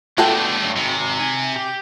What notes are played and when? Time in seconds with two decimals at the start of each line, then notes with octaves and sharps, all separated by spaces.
0.18 G#3 A3 B3 D4 F#4 A4 G5
0.62 G2 F#3
0.76 G#2 C3 D#3
1.20 G#5
1.56 G4